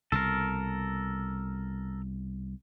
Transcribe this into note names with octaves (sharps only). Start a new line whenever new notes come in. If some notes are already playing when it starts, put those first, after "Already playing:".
C2 B2 A4 A#4